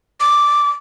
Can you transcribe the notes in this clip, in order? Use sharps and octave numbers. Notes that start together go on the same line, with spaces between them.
D6